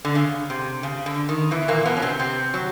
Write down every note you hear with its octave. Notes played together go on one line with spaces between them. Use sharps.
D3
C#3
C3
C#3
D3
D#3
E2 E3
A#2 A#3
B2 B3
C#4
C3 C4
C3 C4
F#3